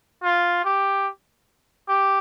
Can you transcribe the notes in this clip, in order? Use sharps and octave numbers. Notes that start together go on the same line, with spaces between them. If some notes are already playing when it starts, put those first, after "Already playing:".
F4
G4
G4